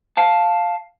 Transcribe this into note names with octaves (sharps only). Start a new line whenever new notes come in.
F5 A5